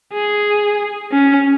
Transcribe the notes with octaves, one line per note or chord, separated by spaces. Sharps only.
G#4
C#4